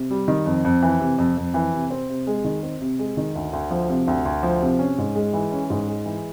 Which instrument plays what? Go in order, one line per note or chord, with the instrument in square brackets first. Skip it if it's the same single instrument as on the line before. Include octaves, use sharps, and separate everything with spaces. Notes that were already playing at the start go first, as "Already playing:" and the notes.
Already playing: [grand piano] C3
G3
D#3
F2
F2
E3
C3
F2
F2
E3
C3
C4
C3
G#3
D#3
C4
C3
G#3
D#3
D2
D2
F3
C3
D2
D2
F3
C3
C#4
G#2
G#3
E3
C#4
G#2
G#3
E3